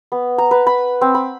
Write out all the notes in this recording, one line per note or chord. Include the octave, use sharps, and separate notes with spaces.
B3
A#5
B4
B5
C4
B5